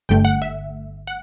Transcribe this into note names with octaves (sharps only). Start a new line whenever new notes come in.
G1 G2 D3 A3 G5
F#5
E5
F#5